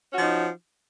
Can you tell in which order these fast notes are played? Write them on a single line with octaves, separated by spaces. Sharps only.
C#4 F#4 F3 D#4